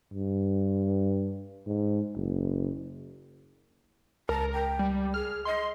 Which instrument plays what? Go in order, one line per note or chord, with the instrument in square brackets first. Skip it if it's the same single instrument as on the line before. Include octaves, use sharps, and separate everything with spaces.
[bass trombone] G2
G#2
F#1
[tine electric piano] C#2 [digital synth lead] A#4 [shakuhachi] A5
[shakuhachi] G5
[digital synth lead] G3
[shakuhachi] G#4 [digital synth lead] F6
[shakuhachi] D#5 [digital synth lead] C6